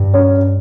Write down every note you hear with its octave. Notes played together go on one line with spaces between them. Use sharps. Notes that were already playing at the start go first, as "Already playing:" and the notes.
Already playing: G2
C#4